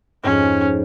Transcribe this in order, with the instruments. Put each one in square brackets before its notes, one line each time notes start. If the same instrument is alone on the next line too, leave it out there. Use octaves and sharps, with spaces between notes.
[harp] F2 G#2 [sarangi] C#4